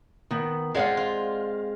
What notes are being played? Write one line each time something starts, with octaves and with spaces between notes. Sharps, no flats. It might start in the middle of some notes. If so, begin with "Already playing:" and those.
D#3 B3
G#3 C4 F4 G4 D5 F#5
F4